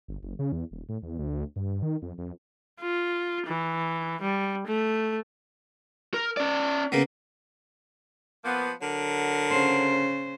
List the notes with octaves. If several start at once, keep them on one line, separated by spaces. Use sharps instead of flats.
G1
F#1
C#3
E2
D#1
A2
E2
D2
G2
D#3
F2
F2
F4
E3
G3
A3
A#4
C#4 D5
C#3 A#3 B3
F3 A#3 B3
D3 F#3 A#4
C#3 C5